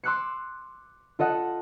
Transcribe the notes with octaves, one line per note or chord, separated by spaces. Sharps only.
C6 D6 E6 F#6 C7 C#7
F4 A4 D#5 F#5